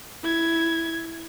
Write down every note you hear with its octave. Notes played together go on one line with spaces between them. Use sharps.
E4 G#6